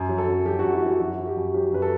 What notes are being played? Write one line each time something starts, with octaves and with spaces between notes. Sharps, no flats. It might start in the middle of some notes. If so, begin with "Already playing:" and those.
Already playing: F#2
F#3
A4
F#2
F#3 G4
F#4
F#2
E4
F#3
F#4
F#2 F#4
F#3
G4
F#2
F#3 G4
F#2 B4
A4